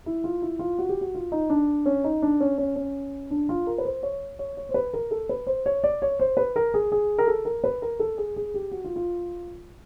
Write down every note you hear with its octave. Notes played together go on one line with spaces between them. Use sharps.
E4
F4
E4
F4
F#4
G4
F#4
F4
D#4
D4
C#4
D#4
D4
C#4
C#4
C#4
D4
F4
A#4
B4
C5
C#5
C#5
C#5
C5
B4
A#4
A4
B4
C5
C#5
D5
C#5
C5
B4
A#4
G#4
G#4
A#4
A4
A#4
B4
A#4
A4
G#4
G#4
G4
F#4
F4
F4